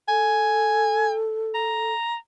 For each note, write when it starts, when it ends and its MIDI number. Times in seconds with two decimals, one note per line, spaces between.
0.09 1.93 69
0.09 1.15 80
1.55 2.16 82